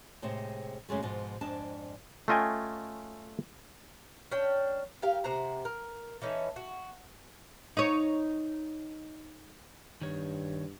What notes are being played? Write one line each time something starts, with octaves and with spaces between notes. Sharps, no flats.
A2 C3 G#3 C4
F#2 C#3 G#3 A3
G#2 B2 F3
F2 G#2 D4 A5
A3 C#4 F4 D#5 G5 G#5
C#4 D4 G5
G4 A#4 F5
C3 C5 F#5 A#5
A#4
E3 C#4 D#4 A4
F#4
D#4 C#5
G2 D#3 C#5